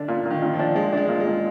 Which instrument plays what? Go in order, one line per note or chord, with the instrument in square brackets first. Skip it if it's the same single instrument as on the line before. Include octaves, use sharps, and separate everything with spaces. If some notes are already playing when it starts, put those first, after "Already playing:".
Already playing: [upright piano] D3 [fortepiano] D4
[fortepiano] A#2
A#2
[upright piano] D#3
[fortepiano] A#2
[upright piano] F3
[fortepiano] D4
[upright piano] G#3 [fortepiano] D4
[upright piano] G#3 [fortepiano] D4
[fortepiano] A#2
[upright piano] G#3
[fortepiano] A#2